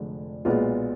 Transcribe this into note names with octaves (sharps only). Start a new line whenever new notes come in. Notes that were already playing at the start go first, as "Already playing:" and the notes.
Already playing: F1 F2 D3 G#3 D4
B1 A#2 G#3 B3 F4